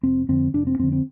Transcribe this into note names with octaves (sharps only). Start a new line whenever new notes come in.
F1 C4
F2 D3 C4
F1 D4
C4
F2 D3 C4
C4